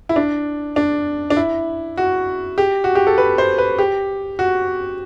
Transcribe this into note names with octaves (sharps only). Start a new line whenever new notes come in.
E4
D4
D4
D4
E4
F#4
G4
F#4
G4
A4
B4
C5
B4
G4
F#4